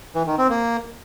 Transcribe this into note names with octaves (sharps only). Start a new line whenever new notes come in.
E3
D#3
C4
A#3